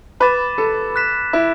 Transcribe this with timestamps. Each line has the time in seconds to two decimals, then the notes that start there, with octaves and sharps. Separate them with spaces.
0.20 B4 B5 D6 A6 E7
0.58 A4
0.96 F#6 B6 E7
1.33 E4